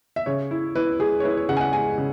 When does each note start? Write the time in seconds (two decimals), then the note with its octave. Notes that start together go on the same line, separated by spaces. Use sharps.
0.16 E5
0.26 C#3 C#5
0.51 E4
0.75 E4 B4
1.00 G#3 G#4
1.20 C#5
1.24 E4 B4
1.37 C#5
1.49 C#3 F#5
1.57 G#5
1.61 F#5
1.73 G#3 G#5
1.98 C#3